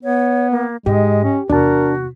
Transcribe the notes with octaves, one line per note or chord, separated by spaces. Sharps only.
B3 C#5
A#3
G#2 G#3 G4 D#5
C#4
E2 C3 D4 F#4 A#4 A5